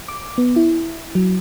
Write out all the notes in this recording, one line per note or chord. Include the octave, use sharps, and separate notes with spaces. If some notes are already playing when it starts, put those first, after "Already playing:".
D6
B3
E4
F#3